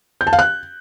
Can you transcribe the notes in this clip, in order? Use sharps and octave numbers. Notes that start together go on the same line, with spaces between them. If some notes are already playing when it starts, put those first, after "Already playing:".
G6
A5
F5
F#6